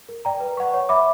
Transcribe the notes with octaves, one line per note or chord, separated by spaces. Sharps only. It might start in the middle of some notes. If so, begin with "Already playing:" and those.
A#4
D5 G5 A#5
B4
F#5 C#6
C#5
E5 B5 D6